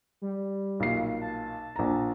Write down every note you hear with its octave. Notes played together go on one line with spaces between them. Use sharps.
G3
B1 A#2 C7
A5
A#1 A#5